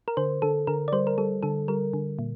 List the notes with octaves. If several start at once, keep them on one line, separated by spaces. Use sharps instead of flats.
A#4
D3 C5
D3 A4
D3 A#4
D5
G3 C5
A#4
G3 A4
D3 A4
G3 A#4
D3
A#2